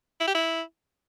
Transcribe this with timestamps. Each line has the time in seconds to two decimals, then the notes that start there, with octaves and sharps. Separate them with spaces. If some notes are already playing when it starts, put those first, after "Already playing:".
0.20 E4
0.27 G4
0.34 E4